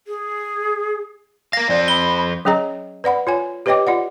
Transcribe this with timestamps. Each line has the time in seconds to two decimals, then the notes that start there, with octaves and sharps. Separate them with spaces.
0.07 G#4
1.53 A#4 F5 A#6
1.69 F2 C4 D5
1.88 B5 G7
2.45 F#3 C#4 G#4 D#5 A#5
3.04 B4 D5 F#5 B5
3.27 F4 C#5 G#5
3.66 G4 B4 C#5 D#5 G5 D6
3.87 F4 D5 F#5